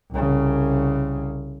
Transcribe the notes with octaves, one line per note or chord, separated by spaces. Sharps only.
C2 C#3